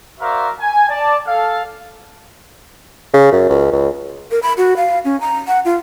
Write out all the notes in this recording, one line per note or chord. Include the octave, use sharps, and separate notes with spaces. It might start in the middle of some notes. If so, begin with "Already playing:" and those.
F#4 A#4 C5 D5 E5 F5
G#5
D5 A5
A4 F5
C#3
F#2
C#2
C#2
A#4
B5
F#4
F5
C#4
A#5
F#5
F4